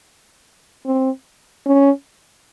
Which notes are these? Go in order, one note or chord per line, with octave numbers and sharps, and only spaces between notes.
C4
C#4